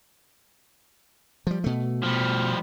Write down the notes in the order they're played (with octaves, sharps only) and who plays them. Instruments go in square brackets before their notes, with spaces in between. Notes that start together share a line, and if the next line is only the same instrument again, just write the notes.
[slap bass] F3 G3
B2 A3
[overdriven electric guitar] F3 G3